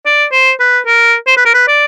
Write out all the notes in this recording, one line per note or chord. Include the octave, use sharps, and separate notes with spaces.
D5
C5
B4
A#4
C5
B4
A#4
B4
D5